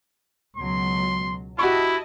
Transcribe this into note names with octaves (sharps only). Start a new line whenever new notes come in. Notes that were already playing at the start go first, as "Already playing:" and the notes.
C#2 B2 F#3 C6
E4 F#4 G4 D#5 A5 C#6